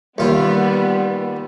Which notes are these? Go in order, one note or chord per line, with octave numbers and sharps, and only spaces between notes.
D#2 G3 B3 F4